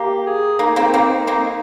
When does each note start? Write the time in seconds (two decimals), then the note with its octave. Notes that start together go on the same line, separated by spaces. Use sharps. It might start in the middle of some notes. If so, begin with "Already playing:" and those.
Already playing: A#3 G4
0.26 G#4
0.59 A#3 D#4
0.76 A#3 C4
0.94 A#3 C4
1.27 A#3 C4